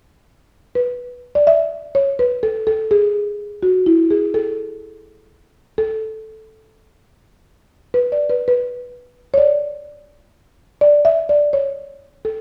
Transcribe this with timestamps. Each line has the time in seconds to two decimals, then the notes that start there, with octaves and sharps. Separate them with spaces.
0.75 B4
1.35 D5
1.47 E5
1.95 C#5
2.19 B4
2.43 A4
2.67 A4
2.91 G#4
3.63 F#4
3.86 E4
4.11 G#4
4.34 A4
5.78 A4
7.94 B4
8.12 D5
8.30 B4
8.48 B4
9.34 C#5
9.38 D5
10.81 D5
11.05 E5
11.29 D5
11.53 C#5
12.25 A4